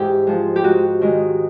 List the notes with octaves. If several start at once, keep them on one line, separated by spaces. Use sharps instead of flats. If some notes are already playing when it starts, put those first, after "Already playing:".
Already playing: G#2 E3 G4
F3 G#3
G4
G#2 F#4
D#3 G#3